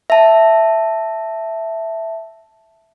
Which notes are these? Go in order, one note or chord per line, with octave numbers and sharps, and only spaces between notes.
E5 A5